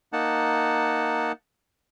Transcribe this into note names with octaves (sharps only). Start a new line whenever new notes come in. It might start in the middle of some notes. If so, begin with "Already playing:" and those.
A#3 D#4 F#5 A5